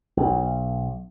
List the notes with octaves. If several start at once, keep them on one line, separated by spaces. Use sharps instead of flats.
B1